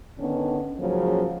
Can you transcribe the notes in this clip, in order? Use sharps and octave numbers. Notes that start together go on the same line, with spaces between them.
D3 D#3 B3 C#4 D4
G#2 C#3 F3 F#3 A#3